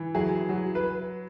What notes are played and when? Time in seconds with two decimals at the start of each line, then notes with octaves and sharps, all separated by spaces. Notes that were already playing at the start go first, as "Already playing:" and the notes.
Already playing: E3
0.14 F#3 G#4
0.49 F#3
0.75 B4